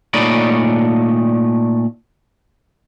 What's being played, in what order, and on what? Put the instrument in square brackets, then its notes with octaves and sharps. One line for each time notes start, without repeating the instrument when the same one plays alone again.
[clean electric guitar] A#2 A3 D#4 C#5 D5 B5